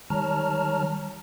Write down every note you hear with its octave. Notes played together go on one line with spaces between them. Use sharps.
D#3 G3 C#5 A5 A#5 F6